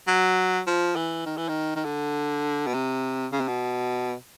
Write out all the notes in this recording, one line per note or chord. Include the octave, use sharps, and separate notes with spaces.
F#3
F3
E3
D#3
E3
D#3
D#3
D3
B2
C3
C#3
C3
B2